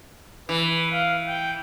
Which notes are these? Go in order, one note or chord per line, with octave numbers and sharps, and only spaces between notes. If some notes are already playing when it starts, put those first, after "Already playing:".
E3 B4
F5
G5